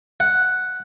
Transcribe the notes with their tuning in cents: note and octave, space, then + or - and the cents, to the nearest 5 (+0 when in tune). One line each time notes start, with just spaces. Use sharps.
F#5 +0